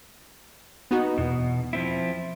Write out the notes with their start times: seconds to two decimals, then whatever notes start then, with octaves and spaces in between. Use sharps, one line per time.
0.91 B3 D#4 F#4
1.18 E2 B2
1.73 F3 C4 E4